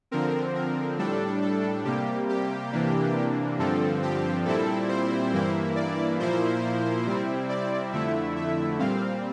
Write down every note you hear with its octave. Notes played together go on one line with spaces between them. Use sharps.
D3 F3 C4 A#4
A#4
A2 G3 D4 A4
A4
C3 G3 A#3 G4
G4
C3 E3 A#3 D4
G2 D3 F3 C4 A4
G4
A#2 G3 C4 E4 A4
C5
G2 E3 A#3 E4
D5
A#2 F3 A#3 E4 C5
C3 G3 C4 E4
D5
F2 D3 A3 E4 E5
E5
A#2 G3 C4 F5